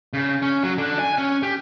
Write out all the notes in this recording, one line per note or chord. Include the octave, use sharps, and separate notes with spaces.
C#3
C#4
F#3
D3
G#5
C#4
G4